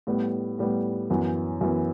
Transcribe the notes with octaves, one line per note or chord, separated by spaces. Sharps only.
A2 G3 B3
A2 G3 B3
F#2 E3 B3
F#2 E3 B3